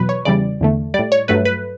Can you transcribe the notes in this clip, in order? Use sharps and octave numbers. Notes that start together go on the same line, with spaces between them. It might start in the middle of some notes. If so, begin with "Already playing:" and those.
Already playing: E2 B2 F#3 B4
C#5
E2 C#3 E3 G3 D5
E2 D3 A3
A2 G3 D5
C#5
G2 F#3 A3 B4
B4